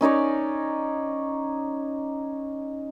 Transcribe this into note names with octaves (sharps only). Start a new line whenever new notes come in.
C#4 D#4 C#5 D5